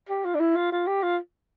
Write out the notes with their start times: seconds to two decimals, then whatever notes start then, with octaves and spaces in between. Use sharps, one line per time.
0.09 G4
0.25 F4
0.35 D4
0.40 E4
0.55 F4
0.72 F4
0.87 G4
1.03 F4